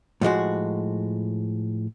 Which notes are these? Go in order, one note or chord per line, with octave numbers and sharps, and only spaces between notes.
A2 F3 G#3 F#4